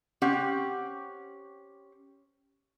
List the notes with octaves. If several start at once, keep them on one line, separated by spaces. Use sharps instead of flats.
C4 C#4 G4 F#5